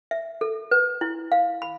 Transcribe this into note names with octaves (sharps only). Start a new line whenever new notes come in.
E5
A4
B4
E4
F5
B5